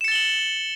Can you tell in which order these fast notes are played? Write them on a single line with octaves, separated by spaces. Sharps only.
E7 C#7 A6 G7 F#7